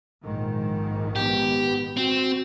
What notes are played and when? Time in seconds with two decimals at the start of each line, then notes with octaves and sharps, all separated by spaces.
0.24 A#1 G#2 D#3
1.16 B3 G4
1.97 C4 F#4